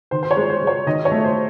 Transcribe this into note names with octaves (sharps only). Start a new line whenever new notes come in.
D#3 C5
C5
C#5
G#3
C5
G#3
C#5
D#3 D#5
C#5
A3
C5